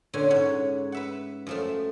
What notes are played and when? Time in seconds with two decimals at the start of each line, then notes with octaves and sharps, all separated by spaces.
0.13 A#2 D3 C#4 G#5
0.30 G#2 C#5 F#5
0.92 B4 E5 F#5
1.47 F#2 F3 A3